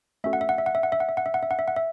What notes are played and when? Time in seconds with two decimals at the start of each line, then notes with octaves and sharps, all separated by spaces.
0.24 A3 C#4 F#4 A4 E5
0.33 F#5
0.41 E5
0.49 F#5
0.58 E5
0.66 F#5
0.75 E5
0.83 F#5
0.92 E5
1.00 F#5
1.09 E5
1.17 F#5
1.26 E5
1.34 F#5
1.43 E5
1.51 F#5
1.59 E5
1.68 F#5
1.76 E5